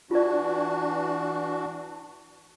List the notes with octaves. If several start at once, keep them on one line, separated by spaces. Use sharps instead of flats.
E3 D4 F4 F#4 D5